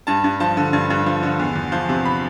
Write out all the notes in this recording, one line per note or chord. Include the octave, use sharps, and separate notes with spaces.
G2 A5
G2
F3 A5
D3
G2
G2
F3
D3
E2
E2
F3
C3
B5